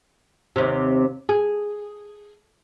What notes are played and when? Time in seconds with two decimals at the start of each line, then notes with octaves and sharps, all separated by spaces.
0.56 D#2 C3
1.29 G#4